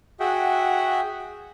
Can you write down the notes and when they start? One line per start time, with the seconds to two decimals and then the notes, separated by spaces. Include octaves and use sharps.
0.20 F#4 G#4 E5 F#5 G5